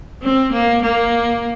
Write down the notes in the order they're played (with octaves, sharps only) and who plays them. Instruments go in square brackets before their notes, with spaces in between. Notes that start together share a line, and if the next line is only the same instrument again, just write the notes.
[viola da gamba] C4
A#3
A#3